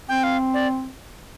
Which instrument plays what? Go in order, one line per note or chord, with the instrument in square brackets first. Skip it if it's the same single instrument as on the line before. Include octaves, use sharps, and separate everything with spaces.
[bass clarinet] C4 [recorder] G5
[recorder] F5
D5